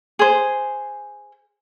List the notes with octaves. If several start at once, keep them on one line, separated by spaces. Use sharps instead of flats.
G#4 C5